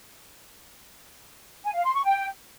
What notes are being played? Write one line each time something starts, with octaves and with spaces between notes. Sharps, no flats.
G#5
F5
C6
C#6
G5